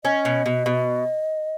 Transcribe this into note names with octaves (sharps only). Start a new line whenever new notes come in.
C#4 D#5
B2
B2
B2